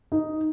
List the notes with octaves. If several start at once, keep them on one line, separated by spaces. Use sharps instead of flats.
D#4